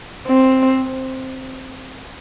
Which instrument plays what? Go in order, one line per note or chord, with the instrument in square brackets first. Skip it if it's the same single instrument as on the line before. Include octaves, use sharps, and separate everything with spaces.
[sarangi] C4